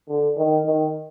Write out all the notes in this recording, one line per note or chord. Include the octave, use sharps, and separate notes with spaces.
D3
D#3
D#3